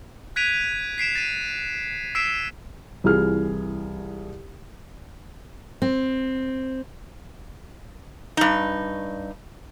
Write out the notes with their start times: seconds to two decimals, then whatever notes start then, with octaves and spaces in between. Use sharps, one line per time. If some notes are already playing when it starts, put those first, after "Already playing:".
0.36 F#6 G#6 B6 D7 D#7 F7
0.98 B6 C7 D7 E7
1.16 A6 D#7
2.15 E6 B6 C7 D7 E7
3.04 C2 E3 F4 G#4 F6
5.82 C4
8.37 G2 D#4